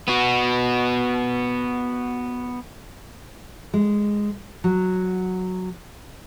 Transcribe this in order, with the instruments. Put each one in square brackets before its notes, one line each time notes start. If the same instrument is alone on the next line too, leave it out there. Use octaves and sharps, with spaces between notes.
[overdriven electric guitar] B3 F#4
[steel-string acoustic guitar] G#3
F#3